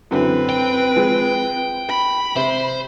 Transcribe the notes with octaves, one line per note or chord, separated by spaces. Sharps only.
F#2 D3 E3 C4 B4
G5
F3 G#3
B5
C3 C5